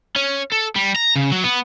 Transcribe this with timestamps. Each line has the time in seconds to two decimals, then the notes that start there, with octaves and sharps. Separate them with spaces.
0.16 C#4
0.52 A4
0.76 G3
0.96 A#5
1.16 C#3
1.32 F#3
1.44 B3